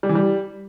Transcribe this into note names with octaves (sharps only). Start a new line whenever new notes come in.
G3
E3
G3